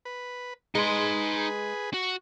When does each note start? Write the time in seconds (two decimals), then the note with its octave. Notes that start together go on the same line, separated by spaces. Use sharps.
0.05 B4
0.75 G#3 D#4 G#4 B4 C6
1.94 F#4